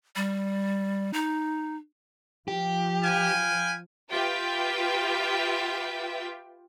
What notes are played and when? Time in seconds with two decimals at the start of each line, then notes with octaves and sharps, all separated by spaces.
0.16 G3
1.13 D#4
2.48 F3 G4
3.03 B4 F5 G5 G#5
4.12 F4 G4 B4 E5 G5